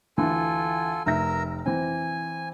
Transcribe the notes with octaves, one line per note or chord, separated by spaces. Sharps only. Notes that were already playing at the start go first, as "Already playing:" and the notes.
D2 E3 F4 A4 G#5
F1 A#4 E5 A#5 E6 A#6
E3 C4 G#5